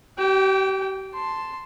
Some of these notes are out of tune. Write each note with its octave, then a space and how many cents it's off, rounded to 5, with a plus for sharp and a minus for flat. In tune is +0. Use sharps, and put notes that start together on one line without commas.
G4 -35 G5 +0
A5 +0 C6 +0